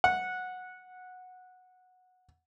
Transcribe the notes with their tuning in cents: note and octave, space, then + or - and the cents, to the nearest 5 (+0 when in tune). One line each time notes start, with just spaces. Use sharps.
F#5 -10